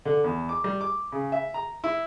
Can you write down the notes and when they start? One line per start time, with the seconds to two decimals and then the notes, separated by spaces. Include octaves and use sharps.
0.05 D3
0.24 E2
0.49 D6
0.64 G3
0.81 D6
1.12 C#3
1.32 E5
1.54 A#5
1.84 E4